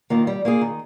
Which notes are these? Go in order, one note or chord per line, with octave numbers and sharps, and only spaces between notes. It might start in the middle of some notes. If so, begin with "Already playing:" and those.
D#3 A#3 F4
G3
A#3 F4 G#4
D#3